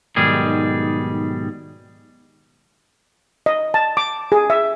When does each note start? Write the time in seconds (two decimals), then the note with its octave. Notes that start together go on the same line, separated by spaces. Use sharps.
0.16 B1 G#2 D#3 G3 G#4
3.46 D#5
3.74 A5
3.97 D6
4.32 G#4
4.50 E5